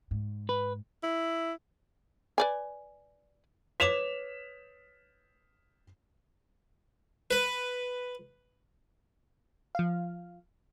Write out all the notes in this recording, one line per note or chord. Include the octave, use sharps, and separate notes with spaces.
G#2
B4
E4
B4 D5 G#5
B4 C#5 D6 B6 E7 F7
B4
F3 F5